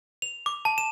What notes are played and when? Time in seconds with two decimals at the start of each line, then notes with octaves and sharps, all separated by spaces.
0.22 F7
0.46 D6
0.65 A5
0.78 E7